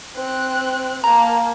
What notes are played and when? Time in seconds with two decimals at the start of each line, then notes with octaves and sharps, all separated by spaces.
0.15 C4 F#6
1.04 A#3 A5 A#5